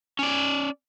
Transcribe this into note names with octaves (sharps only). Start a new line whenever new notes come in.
C#4 D5